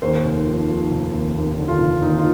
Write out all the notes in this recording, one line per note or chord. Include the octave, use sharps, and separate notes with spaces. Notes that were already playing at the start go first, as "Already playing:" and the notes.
D#2 C5
F1
F3
F3
F1
D#2
D#2
D3
F4
F1
D#2 D#4
F4